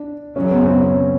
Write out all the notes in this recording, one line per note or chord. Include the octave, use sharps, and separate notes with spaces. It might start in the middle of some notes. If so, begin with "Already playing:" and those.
Already playing: D4
F#2 C#3 F#3 C#4
B3
C4
C#4